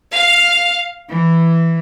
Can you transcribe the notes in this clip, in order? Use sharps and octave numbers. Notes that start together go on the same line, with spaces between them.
F5
E3